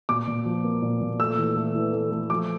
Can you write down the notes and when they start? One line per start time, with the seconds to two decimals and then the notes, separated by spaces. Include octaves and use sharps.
0.09 A#2 D6
0.27 A#2
0.45 F3
0.64 A#3
0.82 A#2
1.01 A#2
1.20 A3 E6
1.38 E3
1.56 A3
1.75 E3
1.93 A3
2.11 A3
2.30 F3 D6